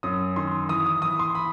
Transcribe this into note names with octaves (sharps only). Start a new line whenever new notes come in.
F#2 D#6
D#3 C6
E3 D#6
D#6
E3 D#6
C6
B5